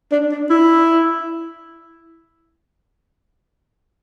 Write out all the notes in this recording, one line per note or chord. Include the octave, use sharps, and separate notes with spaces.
D4
D4
E4